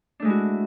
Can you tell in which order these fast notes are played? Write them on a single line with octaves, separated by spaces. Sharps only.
D4 A3 G#3 E4 F#4